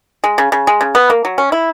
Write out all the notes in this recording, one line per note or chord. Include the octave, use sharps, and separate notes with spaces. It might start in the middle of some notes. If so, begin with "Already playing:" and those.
G#3
C#3
C#3
G#3
C#3
B3
A#3
F#3
C#4
E4